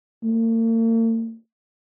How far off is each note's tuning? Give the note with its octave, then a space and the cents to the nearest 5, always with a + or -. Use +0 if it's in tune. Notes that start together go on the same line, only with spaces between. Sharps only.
A#3 -45